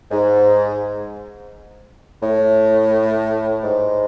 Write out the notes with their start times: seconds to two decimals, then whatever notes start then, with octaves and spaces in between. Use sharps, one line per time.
0.11 G#2
2.22 A2
3.63 G#2